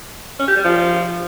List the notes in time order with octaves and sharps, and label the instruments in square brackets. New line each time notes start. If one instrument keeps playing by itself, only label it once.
[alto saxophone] C#4
G4
G3
F3